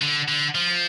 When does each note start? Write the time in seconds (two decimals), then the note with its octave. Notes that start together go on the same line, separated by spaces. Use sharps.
0.01 D3
0.28 D3
0.55 F3